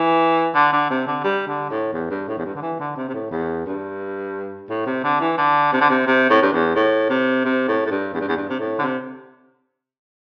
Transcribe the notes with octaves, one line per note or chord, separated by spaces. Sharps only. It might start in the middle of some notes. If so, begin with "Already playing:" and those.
Already playing: E3
D3
D3
C3
D3
G3
D3
A2
E2
G2
A2
E2
G2
D3
E3
D3
C3
C3
A2
E2
G2
A2
C3
D3
E3
D3
C3
D3
C3
C3
A2
G2
E2
A2
C3
C3
A2
A2
G2
E2
G2
E2
G2
C3
A2
D3
C3